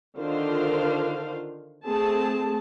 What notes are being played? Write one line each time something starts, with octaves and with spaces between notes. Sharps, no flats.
D3 D#3 D4 F4 C5 F5
A3 C4 G#4 A5